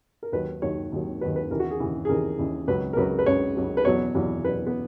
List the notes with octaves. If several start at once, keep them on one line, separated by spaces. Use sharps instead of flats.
A#4
D#2 D#3 F#3 B4
D#2 D#3 F#3 C#5
D#2 D#3 F#3
D#2 D#3 F#3 B4
B4
D#2 C#3 E3 A#4
F#4
G#4
D#2 C#3 E3
G#4
D#2 C#3 E3 A#4
D#2 C#3 E3
C#2 C#3 F#3 B4
A#4
C#2 C#3 F#3 B4
B4
C#2 C#3 F#3 C#5
C#2 C#3 F#3
B4
E2 B2 F#3 C#5
E2 B2 F#3
E2 B2 F#3 B4
B3